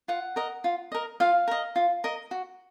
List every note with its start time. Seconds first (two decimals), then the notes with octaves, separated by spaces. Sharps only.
0.08 F4 F#5
0.36 A#4 D#5
0.64 F4
0.92 A#4 D#5
1.20 F4 F5
1.48 A#4 D#5
1.76 F4
2.04 A#4 D#5
2.31 F#4